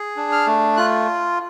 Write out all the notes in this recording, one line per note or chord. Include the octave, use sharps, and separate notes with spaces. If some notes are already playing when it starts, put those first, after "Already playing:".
Already playing: G#4
D4
F6
A3
F4 F#6